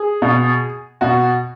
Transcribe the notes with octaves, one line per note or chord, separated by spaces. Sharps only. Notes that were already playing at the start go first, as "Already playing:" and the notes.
Already playing: G#4
B2
B2 F#4